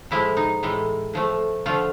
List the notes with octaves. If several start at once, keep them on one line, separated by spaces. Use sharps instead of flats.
A2 F3 G#3 E4
D#4
A2 E3 G#3
A2 F3 A3
D3 F3 A3 F4